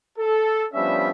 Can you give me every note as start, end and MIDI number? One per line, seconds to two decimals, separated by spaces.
0.18 0.66 69
0.74 1.11 53
0.74 1.11 55
0.74 1.11 59
0.74 1.11 61
0.74 1.11 62
0.74 1.11 76